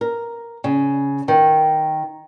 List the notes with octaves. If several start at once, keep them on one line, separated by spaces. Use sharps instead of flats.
A#4
C#3
D#3